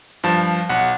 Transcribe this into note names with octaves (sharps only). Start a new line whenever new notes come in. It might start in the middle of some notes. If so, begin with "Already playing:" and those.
G2 F3 A5
B1 F#5